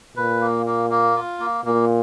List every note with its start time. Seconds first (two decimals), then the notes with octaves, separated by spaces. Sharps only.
0.17 A#2 B4
0.41 A#3
0.66 A#3
0.90 A#3
1.16 F4
1.40 A#3
1.65 A#2 A#3